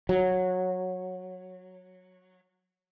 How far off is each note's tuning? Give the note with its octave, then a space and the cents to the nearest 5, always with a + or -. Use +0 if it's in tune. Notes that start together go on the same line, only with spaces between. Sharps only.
F#3 -10